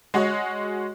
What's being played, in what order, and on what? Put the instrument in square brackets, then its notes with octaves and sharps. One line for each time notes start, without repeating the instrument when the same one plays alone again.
[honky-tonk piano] G#3 F#4 C#5 D#5